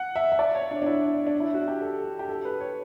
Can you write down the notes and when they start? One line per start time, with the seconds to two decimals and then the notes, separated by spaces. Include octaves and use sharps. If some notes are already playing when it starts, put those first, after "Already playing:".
Already playing: F#5
0.16 E5
0.32 E5
0.39 D5
0.55 C#5
0.71 D4
0.82 D4
0.86 E4
1.27 D4
1.40 E4
1.54 F#4
1.68 G4
1.82 A4
2.19 G4
2.29 A4
2.45 B4
2.60 C#5